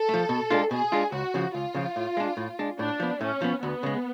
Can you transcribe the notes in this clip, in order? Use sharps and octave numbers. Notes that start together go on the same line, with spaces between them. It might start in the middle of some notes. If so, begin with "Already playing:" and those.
Already playing: A4
F3 A3
B2
G#3 D4 F4
B2 G#4
G#3 D4 F4
C#2 F#4
C#3 F3
C#2 F4
C#3 F3
A2
G#3 D4
A2
G#3 D4
A2 D4
F3 B3
A2 C#4
F3 B3
D2 B3
C#3 G#3